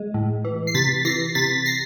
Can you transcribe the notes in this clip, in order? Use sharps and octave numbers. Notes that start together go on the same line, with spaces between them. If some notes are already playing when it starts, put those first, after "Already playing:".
Already playing: G#3
A2
E3
C7
C3 A6 B6
E3 A#6 C7
C3 A6 B6
A#6 C7